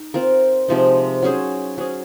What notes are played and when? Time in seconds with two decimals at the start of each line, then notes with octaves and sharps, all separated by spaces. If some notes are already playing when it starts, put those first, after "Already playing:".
Already playing: D#4
0.14 C4 F4 A#4
0.68 C3 F3 G#3 D#4
1.22 F#3 C#4 G#4 C5
1.78 F#3 C#4 G#4